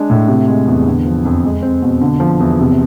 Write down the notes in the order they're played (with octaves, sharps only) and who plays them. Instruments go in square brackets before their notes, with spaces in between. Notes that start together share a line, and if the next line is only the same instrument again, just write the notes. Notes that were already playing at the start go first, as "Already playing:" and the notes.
Already playing: [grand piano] G#3 D4
A2
C3
G#3
E2
D3
F3
F2
G#3
C4
B2
D3
F3
E2
C3